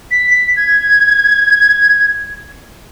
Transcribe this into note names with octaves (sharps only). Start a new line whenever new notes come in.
B6
B6
G#6